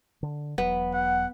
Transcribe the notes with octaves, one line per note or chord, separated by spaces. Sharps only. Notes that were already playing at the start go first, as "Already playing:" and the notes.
D3
E1 F#3 B3
F#5